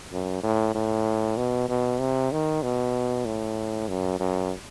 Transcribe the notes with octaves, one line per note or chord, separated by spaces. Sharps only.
F#2
A2
A2
B2
B2
C3
D#3
B2
A2
F#2
F#2